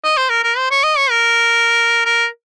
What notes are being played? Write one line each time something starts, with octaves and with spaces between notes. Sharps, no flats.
D#5
C5
A#4
A#4
C5
C#5
D#5
C#5
A#4
A#4